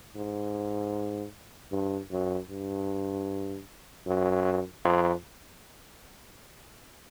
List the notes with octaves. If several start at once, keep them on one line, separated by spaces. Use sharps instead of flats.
G#2
G2
F#2
G2
F#2
F2